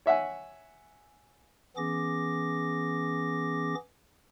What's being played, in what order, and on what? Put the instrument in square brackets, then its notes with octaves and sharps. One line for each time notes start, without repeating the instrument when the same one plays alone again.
[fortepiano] C#5 E5 F#5 G#5
[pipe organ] E3 B3 C#4 G#4 D6 A#6